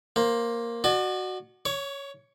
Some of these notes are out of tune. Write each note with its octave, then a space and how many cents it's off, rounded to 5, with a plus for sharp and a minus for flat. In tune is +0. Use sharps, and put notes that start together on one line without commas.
A#3 +0 C5 +20
F#4 +0 D5 +40 A5 -45
C#5 +5 C#6 +40